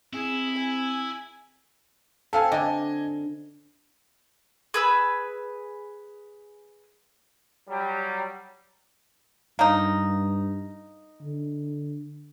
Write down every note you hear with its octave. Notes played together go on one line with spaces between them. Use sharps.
C4 E4 G#4
G#5
C4 A4 F5 G#5
D3 D#5 G#5
G#4 B4 E6
F#3 G3
G2 A#3 D#4
D3